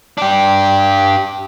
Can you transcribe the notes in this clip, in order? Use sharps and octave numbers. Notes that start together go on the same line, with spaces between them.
D4 G4